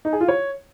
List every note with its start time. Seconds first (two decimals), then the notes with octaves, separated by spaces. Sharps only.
0.05 D#4
0.13 G#4
0.21 F4
0.28 C#5